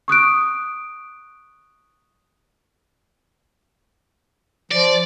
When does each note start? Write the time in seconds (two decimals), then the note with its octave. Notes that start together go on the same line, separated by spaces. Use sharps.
0.08 C#6 D#6 F#6 D7
4.71 F3 D5